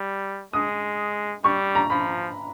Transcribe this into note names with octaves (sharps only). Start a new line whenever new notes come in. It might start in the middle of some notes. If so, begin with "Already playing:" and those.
Already playing: G3
G#3 D#6
G3 C#6
A#5
F3 B5